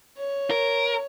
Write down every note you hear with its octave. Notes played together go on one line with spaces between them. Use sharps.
C#5
A#4